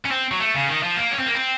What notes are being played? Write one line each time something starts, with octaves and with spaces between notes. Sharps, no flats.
C#4
C4
F#3
A3
C#3
D#3
F3
A#3
C#4
C4
A#3
C4